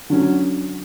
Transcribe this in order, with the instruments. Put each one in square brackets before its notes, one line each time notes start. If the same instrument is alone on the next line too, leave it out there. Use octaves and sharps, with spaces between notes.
[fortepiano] D3 F#3 C#4